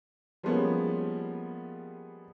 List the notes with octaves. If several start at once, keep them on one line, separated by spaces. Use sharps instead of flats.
F3 G3 G#3 A#3 B3 C#4